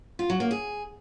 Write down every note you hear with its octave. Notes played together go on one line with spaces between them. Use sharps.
F4
F#3
A#3
G#4